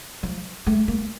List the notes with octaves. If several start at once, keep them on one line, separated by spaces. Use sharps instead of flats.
F3
A3
A#3